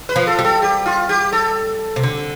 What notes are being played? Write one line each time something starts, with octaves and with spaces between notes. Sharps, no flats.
B4
F3
A4
G3
A4
G4
F4
G4
A4
C3
D3